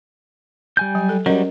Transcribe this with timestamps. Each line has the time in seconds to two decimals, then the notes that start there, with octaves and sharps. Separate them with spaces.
0.77 G3 G#5 G6
0.95 F#3
1.09 A4
1.26 F#3 G3 C#4 A#4 D#5